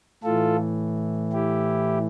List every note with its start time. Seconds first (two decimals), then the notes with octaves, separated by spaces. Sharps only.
0.24 A2 E3 F4 A4
1.33 E4 G4